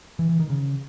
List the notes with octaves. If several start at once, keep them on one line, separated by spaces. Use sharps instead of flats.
E3
E3
D#3
C#3